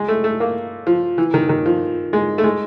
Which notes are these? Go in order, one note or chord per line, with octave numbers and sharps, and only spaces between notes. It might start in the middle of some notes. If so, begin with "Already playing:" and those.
Already playing: G#3
A3
A3
A#3
F3
E3
D#3
D#3
F3
G#3
A3
G#3